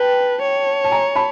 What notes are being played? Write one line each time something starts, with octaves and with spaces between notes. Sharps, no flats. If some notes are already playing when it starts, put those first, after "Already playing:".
Already playing: B4 G5 A5
C#5
A5
G#5 A#5
A5 B5